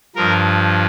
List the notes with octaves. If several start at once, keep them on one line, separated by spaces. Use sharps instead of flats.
G2 F3 A#4